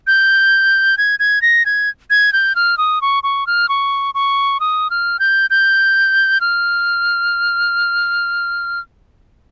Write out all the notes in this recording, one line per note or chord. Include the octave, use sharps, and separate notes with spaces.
G6
G#6
G#6
A#6
G#6
G#6
G6
F6
D#6
C#6
C#6
F6
C#6
C#6
D#6
F6
G6
G6
F6